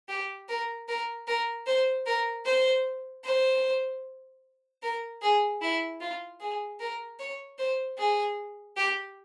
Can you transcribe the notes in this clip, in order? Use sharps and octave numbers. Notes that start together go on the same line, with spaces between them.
G4
A#4
A#4
A#4
C5
A#4
C5
C5
A#4
G#4
E4
F4
G#4
A#4
C#5
C5
G#4
G4